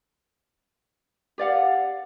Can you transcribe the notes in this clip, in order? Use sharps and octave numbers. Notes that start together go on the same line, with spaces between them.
G4 D5 F5 F#5